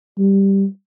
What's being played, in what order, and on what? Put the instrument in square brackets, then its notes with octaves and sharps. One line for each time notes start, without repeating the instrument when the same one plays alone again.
[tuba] G3